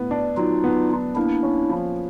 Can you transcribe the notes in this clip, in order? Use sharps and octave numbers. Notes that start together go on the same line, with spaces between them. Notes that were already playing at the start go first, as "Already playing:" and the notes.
Already playing: A2 B3
D4
F#3 D#4 F4
B3
B3
A#3 D4 E4
C#4
F3